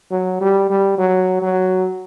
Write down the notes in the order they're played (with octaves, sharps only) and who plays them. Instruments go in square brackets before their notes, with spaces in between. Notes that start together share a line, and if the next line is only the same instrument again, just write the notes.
[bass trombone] F#3
G3
G3
F#3
F#3